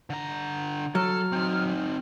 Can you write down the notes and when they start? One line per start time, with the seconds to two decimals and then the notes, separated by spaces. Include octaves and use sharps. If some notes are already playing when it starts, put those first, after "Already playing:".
0.10 D3 A#5
0.95 F#3 A4 F6
1.32 C4 D#4